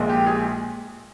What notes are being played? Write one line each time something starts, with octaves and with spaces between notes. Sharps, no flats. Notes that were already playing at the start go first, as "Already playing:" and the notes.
Already playing: A#1 A#2 G#3
G4
G#4